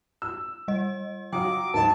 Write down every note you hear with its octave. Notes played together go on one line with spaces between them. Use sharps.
E6
G3 D#5
F#3 F4 G5 D6 D#6
D2 G#2 F#3 A#4 D#5 A5